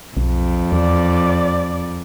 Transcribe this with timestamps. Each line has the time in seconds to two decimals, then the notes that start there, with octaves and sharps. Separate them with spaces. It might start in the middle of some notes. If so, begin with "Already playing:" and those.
0.17 B1 F2
0.72 E2 D5